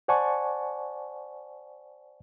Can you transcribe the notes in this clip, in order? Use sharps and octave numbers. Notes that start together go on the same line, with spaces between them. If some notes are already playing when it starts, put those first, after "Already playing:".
C5 D5 F#5 G#5 A5 C#6